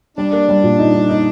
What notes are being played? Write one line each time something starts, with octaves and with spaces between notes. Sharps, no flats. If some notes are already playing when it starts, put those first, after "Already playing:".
G3 D4
A#3
G3
A#2
D#4
D#4
D#4